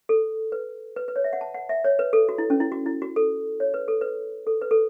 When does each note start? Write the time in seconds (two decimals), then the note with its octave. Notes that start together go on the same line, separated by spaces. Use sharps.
0.09 A4
0.52 B4
0.96 B4
1.08 B4
1.16 C#5
1.24 E5
1.33 F#5
1.41 A5
1.54 F#5
1.69 E5
1.84 C#5
1.99 B4
2.13 A4
2.29 F#4
2.38 E4
2.50 C#4
2.60 E4
2.72 F#4
2.86 E4
3.02 F#4
3.16 A4
3.60 C#5
3.74 B4
3.88 A4
4.01 B4
4.47 A4
4.62 B4
4.71 A4